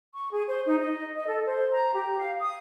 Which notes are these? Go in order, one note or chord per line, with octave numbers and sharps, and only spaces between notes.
C#6
G#4
C5
D#4
D#5
D#5
A4
C5
A#5
G4
F5
D#6